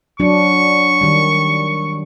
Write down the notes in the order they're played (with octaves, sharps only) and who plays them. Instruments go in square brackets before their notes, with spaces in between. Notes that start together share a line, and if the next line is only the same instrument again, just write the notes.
[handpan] F#3 D4 [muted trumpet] C#6
[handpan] D#3 G3